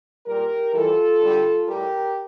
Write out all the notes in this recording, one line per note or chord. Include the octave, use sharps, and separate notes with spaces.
A#2 G3 G4 A#4
F2 E3 G3 F4 A4
G2 D3 G3
A2 G3 G4 A#4